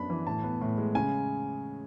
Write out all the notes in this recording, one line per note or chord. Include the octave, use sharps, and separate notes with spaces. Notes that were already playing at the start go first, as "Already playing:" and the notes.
Already playing: F#2 B3 D4 B5
E3
A2 A5
B3
A2
G#3
C#3 G#5